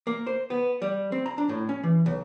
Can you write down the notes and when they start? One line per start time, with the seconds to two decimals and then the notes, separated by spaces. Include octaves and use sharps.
0.07 A#3
0.27 C5
0.50 B3
0.82 G3
1.12 C4
1.26 A#5
1.38 D4
1.49 A2
1.69 C#4
1.84 E3
2.06 B1